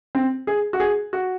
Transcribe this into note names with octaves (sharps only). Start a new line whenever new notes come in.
C4
G#4
F#4
G#4
F#4